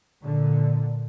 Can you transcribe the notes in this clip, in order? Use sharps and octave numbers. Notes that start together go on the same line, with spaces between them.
A#2 D3